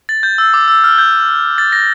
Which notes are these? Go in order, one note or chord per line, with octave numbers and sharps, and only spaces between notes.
A6
G6
E6
D6
E6
F6
G6
A6
A#6